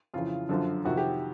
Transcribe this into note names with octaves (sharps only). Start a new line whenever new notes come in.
F2 C#3 E3 F4
F#2 D3 F3
F2 C3 D#3 F#4
G4